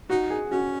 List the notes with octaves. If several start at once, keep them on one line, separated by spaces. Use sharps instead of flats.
D#4 F#4
G#4
C#4 F#4